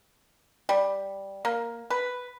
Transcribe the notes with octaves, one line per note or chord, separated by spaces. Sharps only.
G3
A#3
B4